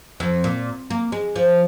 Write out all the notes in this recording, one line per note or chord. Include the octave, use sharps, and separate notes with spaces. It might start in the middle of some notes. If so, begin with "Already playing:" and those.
F2
A#2
A#3
G#3
F3